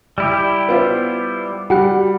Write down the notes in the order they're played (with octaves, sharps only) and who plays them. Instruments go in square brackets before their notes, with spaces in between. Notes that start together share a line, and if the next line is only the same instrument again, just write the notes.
[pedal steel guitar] G3 E4 G4
[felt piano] B3 F4 C5
[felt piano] G3 [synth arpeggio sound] F#4 G4 F#5